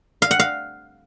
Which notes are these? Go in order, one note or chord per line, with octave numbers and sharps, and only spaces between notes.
F5
F#5
F5